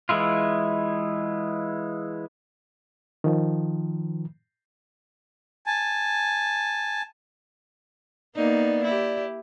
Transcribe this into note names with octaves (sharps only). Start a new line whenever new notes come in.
E3 G#3 E4 F4
D#3 F3
G#5 A5
A#3 B3 D#4 D5
E4 G4